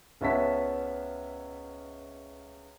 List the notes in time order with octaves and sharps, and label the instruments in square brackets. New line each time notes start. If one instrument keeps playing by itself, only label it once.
[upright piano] C#2 B3 C#4 E5 A5 B6